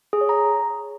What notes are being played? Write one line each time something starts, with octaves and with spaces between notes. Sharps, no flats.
G#4
C#5
A#5